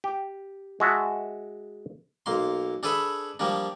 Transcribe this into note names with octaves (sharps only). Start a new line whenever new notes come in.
G4
G#3 F#4 E5 A5
B1 A#3 C6
D4 G#4 A4 B4 E5 B5
F3 G3 A#3 D4